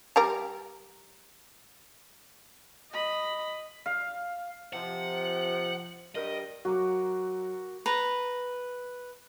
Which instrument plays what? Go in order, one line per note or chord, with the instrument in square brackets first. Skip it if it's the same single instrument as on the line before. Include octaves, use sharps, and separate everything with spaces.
[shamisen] G3 A#4 A#5
[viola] D#5 B5
[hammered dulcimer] F5
[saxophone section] C3 F3 [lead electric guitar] F#5
[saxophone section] G2 G3 A#4 [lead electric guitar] D#5
[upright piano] F#3 [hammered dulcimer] F#4 A#4 D6
[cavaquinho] B4 A#5